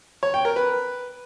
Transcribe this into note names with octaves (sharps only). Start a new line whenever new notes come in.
C#5
G5
A#4
B4